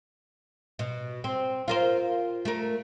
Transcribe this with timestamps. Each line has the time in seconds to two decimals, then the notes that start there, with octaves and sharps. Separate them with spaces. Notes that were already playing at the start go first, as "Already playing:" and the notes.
0.79 B2
1.24 C4
1.68 F4 A#4 C5
2.45 A3 A#4